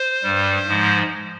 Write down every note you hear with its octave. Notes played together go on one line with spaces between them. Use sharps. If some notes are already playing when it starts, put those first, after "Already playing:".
Already playing: C5
G2 G3
G#2 F3 G#3